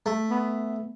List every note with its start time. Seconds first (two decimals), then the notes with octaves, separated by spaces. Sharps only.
0.06 A3
0.31 B3